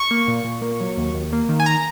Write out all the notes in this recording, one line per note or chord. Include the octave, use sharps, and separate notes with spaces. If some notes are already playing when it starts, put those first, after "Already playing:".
Already playing: C#6
A#3
A#2
A#2
A#3
F#3
D#2
D#2
A#3
D#3
G#5
A#5